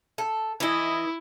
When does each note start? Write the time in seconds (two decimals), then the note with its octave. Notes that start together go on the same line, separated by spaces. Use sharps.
0.18 A4
0.60 E3 E4 D#5